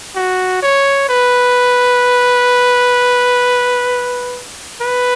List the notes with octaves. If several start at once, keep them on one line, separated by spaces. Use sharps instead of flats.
F#4
C#5
B4
B4